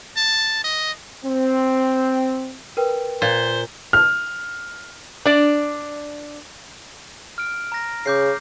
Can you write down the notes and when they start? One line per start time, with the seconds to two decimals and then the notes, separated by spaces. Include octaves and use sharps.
0.17 A5
0.64 D#5
1.24 C4
2.77 A#4 B4 G5
3.22 A#2 C5
3.93 F6
5.26 D4 D5
7.38 F6 D7
7.72 A#5 A#6
8.06 C#3 D6 G6 C7